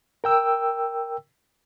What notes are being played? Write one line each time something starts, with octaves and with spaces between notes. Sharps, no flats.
A#4 G5 E6